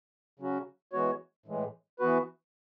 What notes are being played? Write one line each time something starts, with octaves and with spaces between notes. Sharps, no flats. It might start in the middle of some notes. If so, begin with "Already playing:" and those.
C#3 F#3 C#4 F#4
E3 G#3 B3 F#4 C#5
A2 E3 G#3
E3 B3 F#4 B4